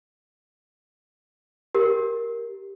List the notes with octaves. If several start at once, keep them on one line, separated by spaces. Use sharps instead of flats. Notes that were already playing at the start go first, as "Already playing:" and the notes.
G4 A#4